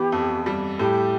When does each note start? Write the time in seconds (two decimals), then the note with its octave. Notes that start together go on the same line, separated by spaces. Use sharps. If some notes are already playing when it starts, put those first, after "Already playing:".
Already playing: E3 B3 G4
0.12 F2
0.46 G3
0.79 A2 G4